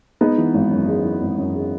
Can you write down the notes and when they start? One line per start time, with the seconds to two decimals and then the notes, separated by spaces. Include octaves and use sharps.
0.21 G#3 B3 D#4
0.38 E3
0.54 G#1
0.71 F#2
0.88 G#3
1.04 E3
1.21 G#1
1.38 F#2
1.55 G#3